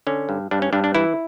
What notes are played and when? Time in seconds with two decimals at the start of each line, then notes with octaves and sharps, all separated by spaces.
0.07 D3 C#4
0.29 G2
0.51 G2 D4
0.62 C#4
0.73 G2 D4
0.84 D4
0.95 E3 E4